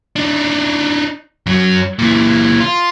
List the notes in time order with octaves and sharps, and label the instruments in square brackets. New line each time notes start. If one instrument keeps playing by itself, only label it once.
[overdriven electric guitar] D4 D#4
F#2 F#3
A#2 E3
F4